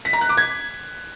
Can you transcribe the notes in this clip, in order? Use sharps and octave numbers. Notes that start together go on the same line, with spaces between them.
B6
A#5
F#6
D6
G#6